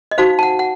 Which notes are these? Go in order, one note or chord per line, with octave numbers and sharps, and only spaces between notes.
D#5
D#4 F#4 C5 F5
A5
F#5
F#5